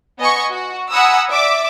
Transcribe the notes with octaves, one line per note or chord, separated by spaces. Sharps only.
B3 D#5 G#5 C#6
F#4
F#5 G#5 A#5 B5 D#6 E6
D5 E5 D6